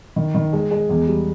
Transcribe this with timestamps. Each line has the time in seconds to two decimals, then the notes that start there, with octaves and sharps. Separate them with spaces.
0.16 D#3
0.35 D#3
0.53 G#3
0.71 G#3
0.89 E2
1.07 G3